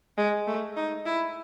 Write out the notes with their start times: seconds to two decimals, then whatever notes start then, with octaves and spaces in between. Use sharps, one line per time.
0.18 G#3
0.47 A3
0.77 D#4
1.06 E4